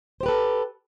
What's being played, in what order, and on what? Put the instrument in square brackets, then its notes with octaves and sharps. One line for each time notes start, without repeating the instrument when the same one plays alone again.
[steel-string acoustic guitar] C5
G4
B4
A4